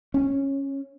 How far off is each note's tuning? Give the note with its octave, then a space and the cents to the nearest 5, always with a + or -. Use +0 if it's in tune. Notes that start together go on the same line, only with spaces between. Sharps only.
C#4 -10